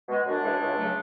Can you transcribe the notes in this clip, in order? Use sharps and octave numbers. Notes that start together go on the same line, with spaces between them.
B2 G#3
F#2 D4
C#3 E3 G#3
C#2
C#3 F#3 A3